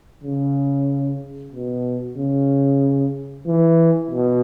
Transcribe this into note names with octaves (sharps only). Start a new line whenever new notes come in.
C#3
B2
C#3
E3
B2